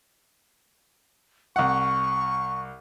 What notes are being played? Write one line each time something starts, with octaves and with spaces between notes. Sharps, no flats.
C2 F#5 C#6